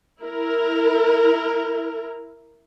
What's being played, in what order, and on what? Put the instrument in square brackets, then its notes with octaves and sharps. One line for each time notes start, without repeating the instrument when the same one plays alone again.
[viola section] E4 A#4